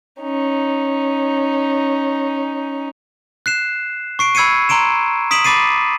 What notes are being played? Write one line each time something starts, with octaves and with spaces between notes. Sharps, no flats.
C#4 D#4
F#6 C7 E7
C#6 C7 D7
B5 E6 G#6 C7 C#7 D#7
A#5 C6 D7 E7
D#6 B6 D7 E7 F#7
B5 D6 A6 C7 D#7